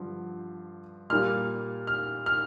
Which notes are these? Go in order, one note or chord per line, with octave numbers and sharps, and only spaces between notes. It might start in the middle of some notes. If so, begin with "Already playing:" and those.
Already playing: G2 D3 F3
A#2 G3 A#3 F6
F6
F6